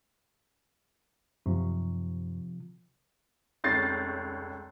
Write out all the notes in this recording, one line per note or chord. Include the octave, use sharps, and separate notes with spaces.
F#2 C3 F3
F1 C#2 C#5 G6 A6 C7